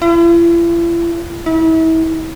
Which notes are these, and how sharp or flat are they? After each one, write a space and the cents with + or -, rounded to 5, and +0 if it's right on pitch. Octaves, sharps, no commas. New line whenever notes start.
E4 +45
E4 -35